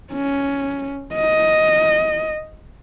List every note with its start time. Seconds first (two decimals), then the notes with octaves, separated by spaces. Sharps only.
0.12 C#4
1.14 D#5